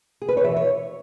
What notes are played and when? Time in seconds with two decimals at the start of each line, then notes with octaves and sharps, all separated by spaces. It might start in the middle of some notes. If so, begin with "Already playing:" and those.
0.22 G#4
0.29 B4
0.37 C#5
0.44 E3 E5
0.56 C#5